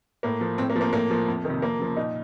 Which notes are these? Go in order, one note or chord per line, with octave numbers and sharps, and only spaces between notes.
A2 A#3
F3
A2 C4
A#3
F3
A#3
A2 A#3
F3
F2
C3 D#3
F2 A#3
C#3 F3
A#2 D#4